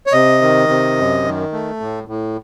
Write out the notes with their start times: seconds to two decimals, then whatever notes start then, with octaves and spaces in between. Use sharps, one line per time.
0.07 C#5
0.12 C3 D#5
0.41 D#3
0.68 C3
0.97 F#2
1.24 D#3
1.53 A3
1.80 A2
2.08 A2